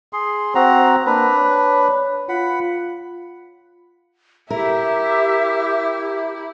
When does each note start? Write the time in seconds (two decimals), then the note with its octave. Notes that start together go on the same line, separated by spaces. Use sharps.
0.13 G#4 C6
0.55 C4 F#4 C5 A#5
1.07 A#3 D4 B4
1.37 C#5
2.29 F4 F#5 B5
4.50 E4 G4 A#4 E5